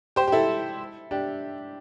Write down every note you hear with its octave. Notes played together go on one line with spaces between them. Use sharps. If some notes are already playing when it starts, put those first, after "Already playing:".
G4 C5
G4
E4 A4
D4 G4